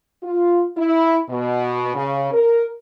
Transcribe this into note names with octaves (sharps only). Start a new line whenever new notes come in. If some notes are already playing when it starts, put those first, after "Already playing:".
F4
E4
B2
C#3
A#4